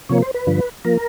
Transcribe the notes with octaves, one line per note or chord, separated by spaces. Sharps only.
C3 F3 A#3 C#5
C5
B4
G2 D3 F3
F3 A#3 A#4